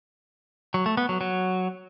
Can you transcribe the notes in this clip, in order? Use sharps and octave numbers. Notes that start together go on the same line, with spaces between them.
F#3
A3
B3
F#3
F#3